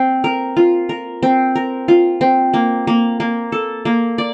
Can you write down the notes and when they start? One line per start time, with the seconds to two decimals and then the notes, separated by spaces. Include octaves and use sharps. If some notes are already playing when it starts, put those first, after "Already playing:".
Already playing: C4
0.24 A#4
0.57 F4
0.89 A#4
1.23 C4
1.55 A#4
1.88 F4
2.21 C4
2.54 A#3
2.87 A#3
3.20 A#3
3.52 A4
3.85 A#3
4.18 D5